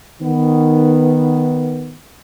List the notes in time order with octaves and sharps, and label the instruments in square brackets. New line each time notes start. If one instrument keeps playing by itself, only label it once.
[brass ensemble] D#3 B3